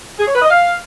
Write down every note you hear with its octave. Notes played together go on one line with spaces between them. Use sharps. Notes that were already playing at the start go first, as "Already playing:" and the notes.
G#4
C#5
B4
D#5
F5